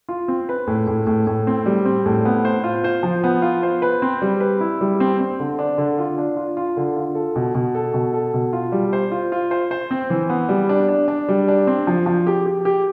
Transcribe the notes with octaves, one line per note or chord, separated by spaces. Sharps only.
F4
C4
B4
A2
A2
A2
A2
C4
G3
C4
A2
B3
C5
F4
C5
F3
B3
F4
C5
B4
C4
G3
B4
E4
G3
C4
C4
D3
D4
D3
F4
D4
F4
F4
D3
F4
A4
B2
B2
A4
B2
A4
B2
F4
G3
C5
F4
F4
C5
C5
C4
E3
B3
G3
D4
D4
D4
G3
D4
C4
F3
F3
G4
G4
G4